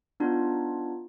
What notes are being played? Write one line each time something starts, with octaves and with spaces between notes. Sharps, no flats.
B3 D4 D#4 F4